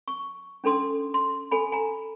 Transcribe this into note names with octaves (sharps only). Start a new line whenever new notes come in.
C#6
C#4 D4 A4 C6 D#6
C6
A4 G#5 B5
G#5 A#5